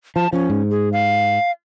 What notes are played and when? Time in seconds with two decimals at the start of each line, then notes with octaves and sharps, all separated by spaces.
0.16 F3 A5
0.33 F3 C#4
0.50 G#2
0.71 G#4
0.93 F5